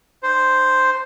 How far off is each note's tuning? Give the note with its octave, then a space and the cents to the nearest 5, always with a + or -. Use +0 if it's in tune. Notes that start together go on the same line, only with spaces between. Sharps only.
D4 +40 C5 +0